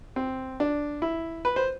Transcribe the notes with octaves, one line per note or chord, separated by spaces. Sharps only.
C4
D4
E4
B4
C5